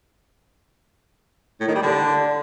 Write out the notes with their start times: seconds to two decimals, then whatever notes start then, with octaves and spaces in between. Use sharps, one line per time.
1.60 A2
1.68 D#3
1.75 G3
1.83 D3